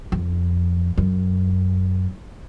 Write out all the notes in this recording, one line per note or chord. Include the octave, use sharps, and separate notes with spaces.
F2
F#2